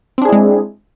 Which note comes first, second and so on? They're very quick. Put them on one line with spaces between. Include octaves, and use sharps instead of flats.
C4 D4 G#4 E4 G#3